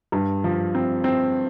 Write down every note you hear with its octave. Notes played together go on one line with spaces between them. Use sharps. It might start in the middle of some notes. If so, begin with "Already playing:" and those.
G2
F3
C4
C4